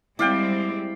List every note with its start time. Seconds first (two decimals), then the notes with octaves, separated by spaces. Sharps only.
0.19 G3 G#3 C4 E4 D5 F5 G5